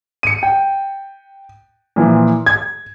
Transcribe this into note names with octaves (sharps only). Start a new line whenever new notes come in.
C#7 D#7
G5
A#2 E3 F3
G#6